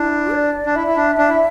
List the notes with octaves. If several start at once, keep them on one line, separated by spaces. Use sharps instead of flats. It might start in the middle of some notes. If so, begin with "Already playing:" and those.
Already playing: D4 E4
D5
D4
E4 E5
E4
D4
D4
E4